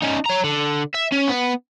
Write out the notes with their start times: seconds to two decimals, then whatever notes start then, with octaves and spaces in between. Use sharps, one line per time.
0.02 C#4 D#4
0.26 C#5 A#5
0.44 D3
0.95 E5
1.12 C#4
1.28 B3